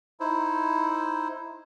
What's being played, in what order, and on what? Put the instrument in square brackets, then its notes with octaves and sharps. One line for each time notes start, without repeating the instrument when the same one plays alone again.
[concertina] D#4 E4 C5